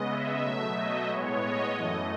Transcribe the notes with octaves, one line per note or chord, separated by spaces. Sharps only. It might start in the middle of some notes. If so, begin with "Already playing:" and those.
Already playing: C#3 G#3 B3 D#5
E5
B2 F#3 A3
D#5
A2 G#3 B3 C#5
D#5
F#2 E3 A3